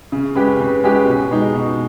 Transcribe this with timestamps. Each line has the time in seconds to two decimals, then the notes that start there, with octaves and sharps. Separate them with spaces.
0.12 C#3
0.35 G#3 C#4 G4 B4
0.60 C#3
0.84 G#3 C#4 G4 B4
1.07 B2
1.31 G#3 D#4
1.54 B2